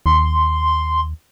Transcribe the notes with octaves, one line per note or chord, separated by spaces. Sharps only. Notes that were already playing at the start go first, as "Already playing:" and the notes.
D#2 C6